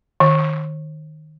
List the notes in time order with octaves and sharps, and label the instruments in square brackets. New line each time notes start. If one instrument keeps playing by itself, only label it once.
[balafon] D#3